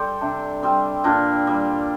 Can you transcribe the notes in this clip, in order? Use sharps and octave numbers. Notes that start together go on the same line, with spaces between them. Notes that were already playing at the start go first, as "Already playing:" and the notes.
Already playing: G3 A4 C5 D5
C3 D4
G3 C4
A#2 D4
G3